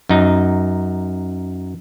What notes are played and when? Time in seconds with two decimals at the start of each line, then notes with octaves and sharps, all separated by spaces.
0.09 F#2 D#4